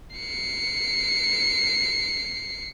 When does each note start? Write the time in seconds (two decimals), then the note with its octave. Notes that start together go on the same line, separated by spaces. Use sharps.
0.16 C7 C#7